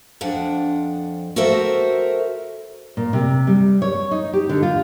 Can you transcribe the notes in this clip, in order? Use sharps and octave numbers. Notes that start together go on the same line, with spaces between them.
F2 D4 F#5
F#4 A4 A#4 C5 E5
A#2
C3
G3
C#5
D#4
G4
D3
F4